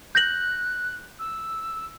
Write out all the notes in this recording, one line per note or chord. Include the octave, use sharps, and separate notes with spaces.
F#6 G6 A#6 F#7
E6